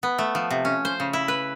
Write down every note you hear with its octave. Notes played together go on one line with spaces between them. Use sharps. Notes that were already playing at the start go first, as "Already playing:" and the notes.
B3
A3
F3
C3
C#4
C5
C#3
E4
B4